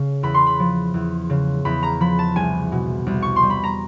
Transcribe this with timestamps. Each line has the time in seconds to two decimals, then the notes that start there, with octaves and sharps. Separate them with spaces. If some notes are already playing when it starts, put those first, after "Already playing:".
Already playing: C#3
0.23 E2 B5
0.34 C6
0.47 B5
0.60 F3
0.94 E2
1.30 C#3
1.65 E2 B5
1.83 A#5
2.00 F3 B5
2.19 A5
2.36 C2 G#5
2.72 B2
3.06 C2
3.22 C#6
3.36 C6
3.43 G3
3.50 B5
3.64 A#5